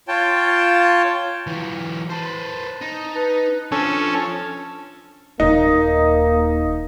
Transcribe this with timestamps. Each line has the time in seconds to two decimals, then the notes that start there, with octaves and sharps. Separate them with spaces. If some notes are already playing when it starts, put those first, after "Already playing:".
0.08 F4 C#5 G5 A5
1.47 E3 F#3
2.10 B4 C5 A5
2.82 D#4
3.15 B4
3.72 F3 C#4 D4 A4
5.40 D#1 D#2 A#3 D#4